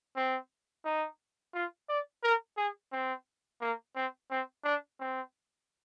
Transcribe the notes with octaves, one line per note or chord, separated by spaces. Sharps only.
C4
D#4
F4
D5
A#4
G#4
C4
A#3
C4
C4
D4
C4